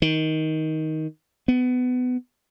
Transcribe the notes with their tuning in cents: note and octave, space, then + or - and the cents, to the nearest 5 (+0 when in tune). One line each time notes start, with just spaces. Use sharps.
D#3 +15
B3 +20